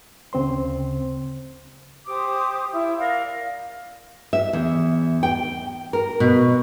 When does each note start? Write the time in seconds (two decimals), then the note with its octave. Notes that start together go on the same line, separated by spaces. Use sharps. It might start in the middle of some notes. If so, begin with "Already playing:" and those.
0.33 D2 C#3 C4 C5 C6
2.06 G4 C5 D6 D#6
2.71 E4
2.99 A#4 D5 F5
4.33 E5
4.53 E2
5.23 G5
5.93 A#4
6.20 B2